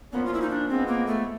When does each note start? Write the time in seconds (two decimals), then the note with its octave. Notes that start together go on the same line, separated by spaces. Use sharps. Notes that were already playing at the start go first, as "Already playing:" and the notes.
0.12 A#2 F3 A#3 B3 C#4
0.25 F4
0.34 E4
0.42 D#4
0.50 D4
0.69 F3 G#3 B3 C4
0.88 A#3
1.07 A3